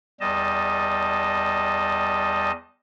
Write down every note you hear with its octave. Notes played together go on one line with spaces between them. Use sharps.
E2 G3 D#5 A5